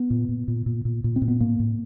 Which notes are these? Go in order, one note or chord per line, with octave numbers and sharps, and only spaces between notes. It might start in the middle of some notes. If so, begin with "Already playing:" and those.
Already playing: B3
A#2
A#2
A#2
A#2
A#2
A#2
C4
A#2
B3
A2 A#3
A2